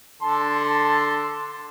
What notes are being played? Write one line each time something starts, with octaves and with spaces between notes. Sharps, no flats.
D3 A4 A5 C6